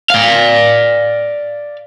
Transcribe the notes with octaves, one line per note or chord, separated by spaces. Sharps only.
D5 F5